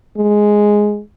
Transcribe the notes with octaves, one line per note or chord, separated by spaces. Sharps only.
G#3